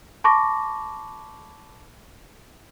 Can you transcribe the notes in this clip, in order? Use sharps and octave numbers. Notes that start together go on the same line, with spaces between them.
A5 B5 C#6 D6 A#6